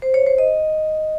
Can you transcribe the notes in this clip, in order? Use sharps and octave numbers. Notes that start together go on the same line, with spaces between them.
C5
C#5
C5
D#5